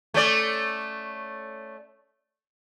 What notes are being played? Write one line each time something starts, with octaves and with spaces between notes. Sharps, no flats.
A3 C#4 D5